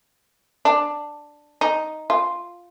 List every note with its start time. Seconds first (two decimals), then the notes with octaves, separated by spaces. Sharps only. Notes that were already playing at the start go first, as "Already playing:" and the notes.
0.65 D4
1.61 D#4
2.10 F4